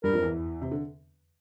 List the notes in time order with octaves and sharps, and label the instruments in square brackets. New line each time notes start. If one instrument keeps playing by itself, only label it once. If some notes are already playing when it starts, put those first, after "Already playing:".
[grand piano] G2 G3 [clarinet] A#4
[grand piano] F2 F3
E2 E3
C3
D3